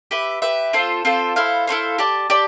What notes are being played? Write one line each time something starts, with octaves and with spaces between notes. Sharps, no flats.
G4 B4 E5
G4 B4 E5
C4 F4 A4 C5
C4 F4 A4 C5
E4 A4 C5 F5
E4 A4 C5 F5
G4 D5 A5
G4 D5 A5